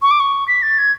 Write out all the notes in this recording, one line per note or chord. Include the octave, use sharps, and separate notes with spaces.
C#6
D6
C#6
B6
A6
G#6